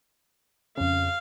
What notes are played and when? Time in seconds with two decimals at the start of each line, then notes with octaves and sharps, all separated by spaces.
0.77 F2 C#3 F5